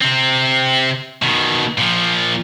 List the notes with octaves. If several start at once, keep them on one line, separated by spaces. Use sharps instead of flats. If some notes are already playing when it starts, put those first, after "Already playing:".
C3 C4
B2 D#3
A#2 F3